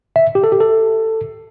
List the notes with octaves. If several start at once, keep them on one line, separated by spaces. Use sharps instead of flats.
E5
G4
A4
G4
A4